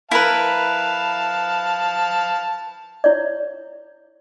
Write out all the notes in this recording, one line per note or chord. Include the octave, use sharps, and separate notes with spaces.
E4 A#4 B4 F5 A5
E4 C#5 D5